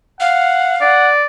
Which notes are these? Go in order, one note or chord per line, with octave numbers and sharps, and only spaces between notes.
F5 F#5
D5 F#5